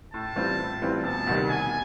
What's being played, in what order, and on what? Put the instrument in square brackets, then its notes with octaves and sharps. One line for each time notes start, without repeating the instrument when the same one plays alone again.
[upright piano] A2 [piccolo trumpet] A5
[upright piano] E3 G3 C4 F4
A2
E3 G3 C4 F4
[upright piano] E1 [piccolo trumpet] A5
[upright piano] D2 C3 D#3 G3
[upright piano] E1 [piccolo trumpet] G#5